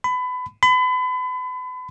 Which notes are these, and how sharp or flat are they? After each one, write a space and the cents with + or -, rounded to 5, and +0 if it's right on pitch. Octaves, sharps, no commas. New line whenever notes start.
B5 +25
B5 +35